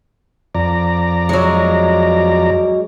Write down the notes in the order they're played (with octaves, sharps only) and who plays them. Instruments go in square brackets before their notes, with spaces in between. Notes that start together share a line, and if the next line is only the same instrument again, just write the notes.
[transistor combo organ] F2 D5 A#5
[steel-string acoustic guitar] F#3 G#3